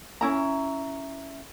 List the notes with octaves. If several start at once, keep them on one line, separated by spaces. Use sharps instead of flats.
C#4 E4 A#5